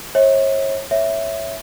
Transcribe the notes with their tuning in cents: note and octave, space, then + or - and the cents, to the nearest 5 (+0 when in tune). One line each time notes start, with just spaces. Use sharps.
C#5 -35 E5 -40
C#5 +0 E5 +0